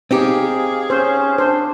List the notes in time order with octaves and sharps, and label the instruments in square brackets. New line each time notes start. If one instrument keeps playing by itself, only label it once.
[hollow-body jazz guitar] C4 D#4 G4 [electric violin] G#4 F5
[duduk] C#4 [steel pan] C5
[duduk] D4 [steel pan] C5